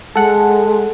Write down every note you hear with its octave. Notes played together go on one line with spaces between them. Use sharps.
G#3 A4 F#5